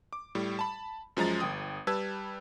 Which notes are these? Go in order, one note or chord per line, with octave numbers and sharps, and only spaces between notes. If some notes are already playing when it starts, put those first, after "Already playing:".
D6
A2 G3
A5 B5
F#2 F3 G#3 A#5 A6
G1 G5 D#6
G3 B4 A5 E6 G#6